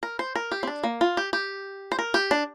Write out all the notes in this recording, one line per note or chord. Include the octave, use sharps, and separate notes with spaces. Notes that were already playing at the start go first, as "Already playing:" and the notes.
A#4
C5
A#4
G4
C4
D4
A#3
F4
G4
G4
C5
A#4
G4
D4